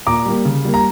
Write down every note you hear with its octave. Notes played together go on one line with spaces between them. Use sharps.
A#2 A#5 D6
G3 A#3
C#3
G3 A#3
A#5